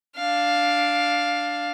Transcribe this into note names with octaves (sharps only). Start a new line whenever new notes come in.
D4 F5